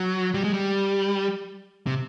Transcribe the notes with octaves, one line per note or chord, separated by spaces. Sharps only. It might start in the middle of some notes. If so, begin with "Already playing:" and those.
Already playing: F#3
G3
G#3
G3
C3